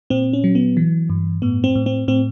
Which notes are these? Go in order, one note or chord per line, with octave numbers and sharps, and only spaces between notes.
A#2 C4
C#4
F#3
B3
E3
G2
A2 B3
C4
A2
C4
A2 C4